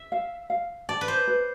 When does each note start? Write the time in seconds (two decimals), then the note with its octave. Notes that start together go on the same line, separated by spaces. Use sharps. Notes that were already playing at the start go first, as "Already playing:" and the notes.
Already playing: E5
0.12 F5
0.50 F5
0.89 D5 A5
1.01 B4
1.08 C5
1.28 B4